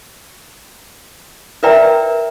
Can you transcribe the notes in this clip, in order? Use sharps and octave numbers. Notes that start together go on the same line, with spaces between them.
A#4 B4 D5 E5 G5 A#5